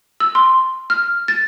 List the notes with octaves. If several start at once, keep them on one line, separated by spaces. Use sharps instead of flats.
E6
C6
F6
A6